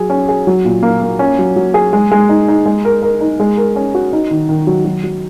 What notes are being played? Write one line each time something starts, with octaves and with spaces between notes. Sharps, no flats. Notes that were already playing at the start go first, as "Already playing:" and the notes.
Already playing: F#3 G#4
C#4
G#4
F#3
A#2
A#3
A#3
C#4
F#3
F#3
G#4
G#3
G#3
D#4
D#4
G#3
A#4
A#4
D#4
G#3
A#4
C#4
F#4
D#4
D#3
D#3
F#3
F#3
F#3